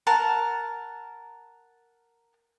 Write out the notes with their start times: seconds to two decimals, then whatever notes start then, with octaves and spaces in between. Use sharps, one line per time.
0.07 A#4 F#5 A5